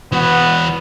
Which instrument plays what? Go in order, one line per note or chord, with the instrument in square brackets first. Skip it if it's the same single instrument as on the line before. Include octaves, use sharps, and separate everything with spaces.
[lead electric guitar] E3 F#4 [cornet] B3